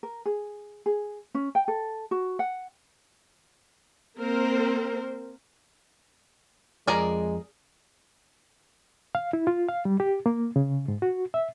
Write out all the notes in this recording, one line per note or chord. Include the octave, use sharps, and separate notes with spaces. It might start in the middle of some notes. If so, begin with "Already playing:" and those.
A#4
G#4
G#4
C#4
G5
A4
F#4
F#5
A#3 C4 A#4 C5
F2 G#3 G#4 A#4 D5 A#5
F5
E4
F4
F5
G3
G4
A#3
C#3
G#2
F#4
E5